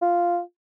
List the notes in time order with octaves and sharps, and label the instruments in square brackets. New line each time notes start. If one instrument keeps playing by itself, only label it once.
[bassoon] F4